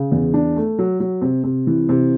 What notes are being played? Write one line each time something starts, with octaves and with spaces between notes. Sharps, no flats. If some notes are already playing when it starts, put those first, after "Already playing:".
Already playing: C#3
E2
D4
A3
F#3
F#3
C3
C3
E3
C3